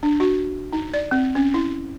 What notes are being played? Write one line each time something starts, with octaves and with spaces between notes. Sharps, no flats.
D4
F#4
D#4
D5
C4
C#4
E4